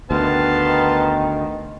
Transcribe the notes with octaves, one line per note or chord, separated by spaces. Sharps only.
D2 D#3 B3 F5 A5 C6